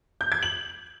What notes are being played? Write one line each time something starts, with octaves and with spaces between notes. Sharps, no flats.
G6
G#6
F#7